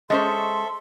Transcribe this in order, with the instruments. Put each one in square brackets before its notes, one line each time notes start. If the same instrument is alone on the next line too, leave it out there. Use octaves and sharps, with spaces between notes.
[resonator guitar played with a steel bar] G#3 C#4 C5 [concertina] A4 E5 [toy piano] D#5 [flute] C6